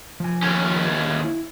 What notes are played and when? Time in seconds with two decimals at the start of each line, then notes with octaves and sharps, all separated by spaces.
0.20 F3 G#5
0.42 D#2 C#4
1.24 E4